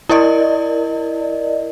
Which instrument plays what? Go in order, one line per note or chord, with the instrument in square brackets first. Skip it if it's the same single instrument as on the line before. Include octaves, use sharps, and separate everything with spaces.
[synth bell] E4 A#4 D5 D#5